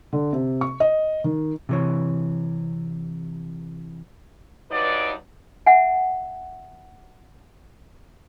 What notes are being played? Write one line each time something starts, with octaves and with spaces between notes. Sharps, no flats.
D3
C3
C#6
D#5
D#3
C3 E3 C#5
G2 F#3 D#4 B4 D5
E5 F#5 G#5